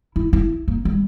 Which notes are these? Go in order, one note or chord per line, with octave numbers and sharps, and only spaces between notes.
E4
E4
A#3
G3